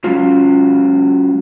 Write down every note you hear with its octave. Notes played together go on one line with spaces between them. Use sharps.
F#3 G#3 C#4 F4